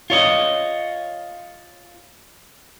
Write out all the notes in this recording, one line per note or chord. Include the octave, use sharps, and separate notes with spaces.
F4 C#5 D#5